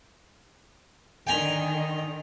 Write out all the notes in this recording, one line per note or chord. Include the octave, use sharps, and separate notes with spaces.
D3 D#3 G5 G#5 A#5